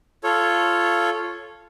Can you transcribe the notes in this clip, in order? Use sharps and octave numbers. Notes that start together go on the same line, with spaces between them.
F4 A4 C#5